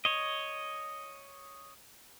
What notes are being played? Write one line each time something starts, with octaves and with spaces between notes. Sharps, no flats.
C#5 D#5